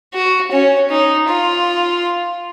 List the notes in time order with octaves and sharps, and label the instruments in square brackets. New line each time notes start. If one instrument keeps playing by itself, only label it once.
[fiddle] F#4
C#4
D#4
F4